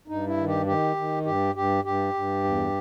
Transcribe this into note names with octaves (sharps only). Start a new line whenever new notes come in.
G2 D#4
E4
D#3
G4
D#3 G4
D#3
G2 G4
G2 G4
G2 G4
G2
E2